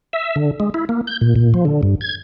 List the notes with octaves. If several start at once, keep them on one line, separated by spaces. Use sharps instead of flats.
E5
D3
G#3
E4
A#3
G6
A#2
A#2
F3
D3
G2
G#6